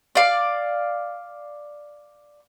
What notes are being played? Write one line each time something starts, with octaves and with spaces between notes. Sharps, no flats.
D5 F5